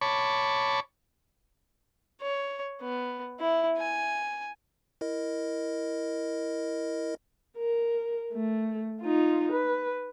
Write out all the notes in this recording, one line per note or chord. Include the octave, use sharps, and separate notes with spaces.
C#5 A5 B5 C#6 D6
C#5
B3
E4
G#5
E4 A#4 D#5
A#4
A3
D#4 F4
B4